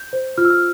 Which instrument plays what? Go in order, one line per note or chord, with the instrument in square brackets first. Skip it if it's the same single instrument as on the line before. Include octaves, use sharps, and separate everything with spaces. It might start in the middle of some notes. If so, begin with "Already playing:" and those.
Already playing: [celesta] G6
C5
F4 F6
E6
F6